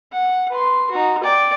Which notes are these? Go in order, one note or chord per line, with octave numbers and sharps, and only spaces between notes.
F#5
B4 C6
D#4 F#4
D5 G5